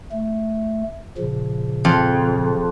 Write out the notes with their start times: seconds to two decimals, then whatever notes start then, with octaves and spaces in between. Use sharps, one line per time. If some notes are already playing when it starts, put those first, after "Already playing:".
0.12 A3
1.18 A#2 C#3 F3
1.85 F2